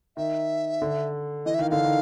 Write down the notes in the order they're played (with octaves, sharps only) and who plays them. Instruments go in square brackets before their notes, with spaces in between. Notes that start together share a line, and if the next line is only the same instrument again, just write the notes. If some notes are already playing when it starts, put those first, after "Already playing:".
[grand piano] D#3 [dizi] E5
[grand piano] D3
[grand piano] E3 [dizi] D#5
[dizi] E5
[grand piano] D#3 [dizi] F5
[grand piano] D3 [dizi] F5
[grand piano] D#3